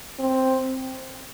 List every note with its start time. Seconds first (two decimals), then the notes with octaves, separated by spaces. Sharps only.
0.19 C4